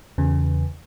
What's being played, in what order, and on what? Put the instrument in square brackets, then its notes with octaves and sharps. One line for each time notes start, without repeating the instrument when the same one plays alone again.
[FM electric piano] E2 C#3